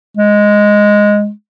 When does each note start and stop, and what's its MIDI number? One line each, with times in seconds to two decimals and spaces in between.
0.17 1.31 56